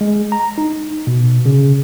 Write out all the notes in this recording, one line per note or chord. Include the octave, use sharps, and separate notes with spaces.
G#3
A#5
D#4
B2
C#3